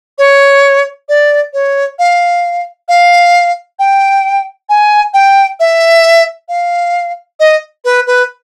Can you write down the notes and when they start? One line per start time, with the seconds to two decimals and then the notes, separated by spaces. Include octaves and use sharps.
0.18 C#5
1.09 D5
1.53 C#5
1.99 F5
2.89 F5
3.79 G5
4.69 G#5
5.14 G5
5.60 E5
6.49 F5
7.40 D#5
7.85 B4
8.07 B4